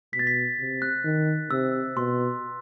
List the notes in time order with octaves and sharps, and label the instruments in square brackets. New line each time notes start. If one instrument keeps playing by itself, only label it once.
[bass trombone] B2 [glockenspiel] B6
[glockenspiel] A6
B6
[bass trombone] C3
[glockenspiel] F#6
[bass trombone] D#3
[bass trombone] C3 [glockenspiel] E6
[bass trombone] B2 [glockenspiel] C6